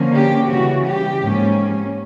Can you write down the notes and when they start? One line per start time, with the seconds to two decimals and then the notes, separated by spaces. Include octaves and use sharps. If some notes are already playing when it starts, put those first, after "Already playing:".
Already playing: D3 F3 A#3 C#4
0.13 G4
0.48 C#3 E3 G3 F#4
0.85 G4
1.21 G#2 F3 A#3 C#4